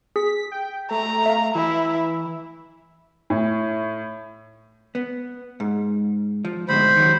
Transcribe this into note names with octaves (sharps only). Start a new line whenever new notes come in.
G#4 B6
G5
A3 A#5
E5 F5
E3 E4
A2
B3
G#2
F3
D2 G#2 B2 C5 B5
D#3 F#3